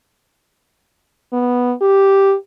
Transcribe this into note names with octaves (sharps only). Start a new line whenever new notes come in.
B3
G4